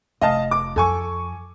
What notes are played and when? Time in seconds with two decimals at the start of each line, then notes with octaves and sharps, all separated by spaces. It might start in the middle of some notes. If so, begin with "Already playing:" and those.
0.21 F1 D#5 F5 A5
0.51 D6
0.76 F2 A4 G#5 C#6